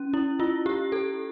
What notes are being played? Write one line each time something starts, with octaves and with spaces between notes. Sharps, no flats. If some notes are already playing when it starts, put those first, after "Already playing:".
Already playing: C#4
E4
F4
G4
A4